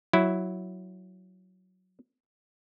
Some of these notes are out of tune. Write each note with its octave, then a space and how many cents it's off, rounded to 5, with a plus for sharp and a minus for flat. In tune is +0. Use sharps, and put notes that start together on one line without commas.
F#3 +0 E4 +0